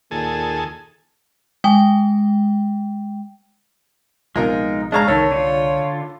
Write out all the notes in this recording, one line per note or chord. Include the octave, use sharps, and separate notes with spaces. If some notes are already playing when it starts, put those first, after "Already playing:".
D#2 A#2 G#4 A4
G#3 G5
A#1 C3 G#3 B3 D#4 F4 A#4
G#3 D4 C#5 D#5 F5 A#5
C2 A2 D#3 A4 C#5
D3 F4